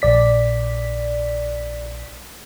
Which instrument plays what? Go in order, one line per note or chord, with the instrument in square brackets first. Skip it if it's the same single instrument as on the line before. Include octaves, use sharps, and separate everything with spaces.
[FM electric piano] A#1 D5 B6